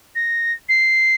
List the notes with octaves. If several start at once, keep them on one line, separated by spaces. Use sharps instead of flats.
A#6
C7